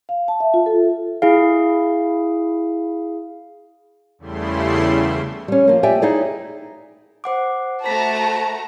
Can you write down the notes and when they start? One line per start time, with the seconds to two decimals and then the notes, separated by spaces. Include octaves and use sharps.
0.09 F5
0.28 A5
0.40 E5
0.54 F4
0.66 A4
1.22 E4 G#4 F5
4.19 E2 C#3 G3 A3 E4 C6
5.48 G3 C#4
5.68 F3 A#3
5.83 G4 D5 E5 G5 G#5
6.02 D#4 E4 G#4 D5
7.24 C5 F#5 D6
7.84 A3 F#4 C5 A5 A#5 B6